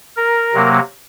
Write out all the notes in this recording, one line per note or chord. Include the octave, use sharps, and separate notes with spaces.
A#4
C3 F#3 A#3